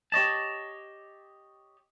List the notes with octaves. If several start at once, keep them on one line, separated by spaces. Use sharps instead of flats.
G4 C#5 D#5 A5